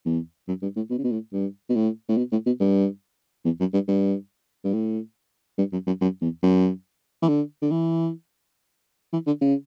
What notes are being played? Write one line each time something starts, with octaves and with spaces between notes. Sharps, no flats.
E2
F#2
G2
A2
B2
C#3
B2
A2
G2
B2
A2
A2
B2
A2
B2
G2
E2
F#2
G2
G2
G2
A2
G2
F#2
F#2
F#2
E2
F#2
E3
D3
D3
E3
E3
D3
C#3